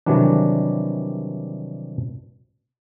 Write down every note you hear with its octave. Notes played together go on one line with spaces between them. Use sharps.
C3 D#3 E3 F#3 G3 D4